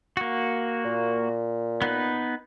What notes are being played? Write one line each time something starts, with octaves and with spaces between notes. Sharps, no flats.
A#3 F#4
A#2
B3 D#4 B4